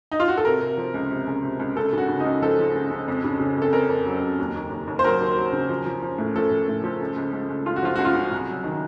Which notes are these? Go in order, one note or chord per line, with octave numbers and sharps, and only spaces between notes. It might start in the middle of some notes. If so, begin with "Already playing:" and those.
D#4
F4
F#4
A4
C3 A#4
C3
F3
C#2
C3
C#2
C3
C#2
C#2 A4
C#3 F#4
C#3
D#4
C#2
F3 A4
F3
C#2
C#2
F2
C#3
C#3
F2 A4
F2 A#4
F2
F#3
F2
D#2
D#2
D#2
D#2
C5
F#3 A#4
D#2
F#3
C#3
F3
F3
F3
A2
F3 A4
F3
A2
F3
C#2
C#2
C#2
C#2
C#2 F4
F#4
F3 F4
C#2 F#4
F4
C#3
C2
F#3
D#3